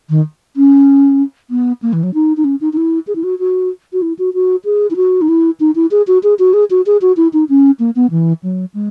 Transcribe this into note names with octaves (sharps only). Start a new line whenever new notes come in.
D#3
C#4
B3
A#3
E3
F#3
D#4
D#4
C#4
D#4
D#4
E4
G#4
E4
F#4
F#4
F#4
E4
F#4
F#4
G#4
E4
F#4
D#4
E4
D#4
E4
G#4
F#4
G#4
F#4
G#4
F#4
G#4
F#4
E4
D#4
C#4
A#3
B3
E3
F#3
G#3